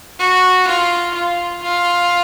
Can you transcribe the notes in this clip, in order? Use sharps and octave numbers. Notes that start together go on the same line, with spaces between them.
F#4
F4
F4
F4